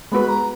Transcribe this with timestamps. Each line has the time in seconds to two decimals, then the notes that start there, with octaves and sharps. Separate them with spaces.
0.12 G#3 B3 F#4 B4 B5
0.28 A#5